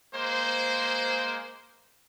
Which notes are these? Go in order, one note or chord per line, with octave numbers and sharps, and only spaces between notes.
G#3 A#3 C5